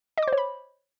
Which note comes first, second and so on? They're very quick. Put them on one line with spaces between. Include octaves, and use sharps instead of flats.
D#5 D6 C5 C#5 B5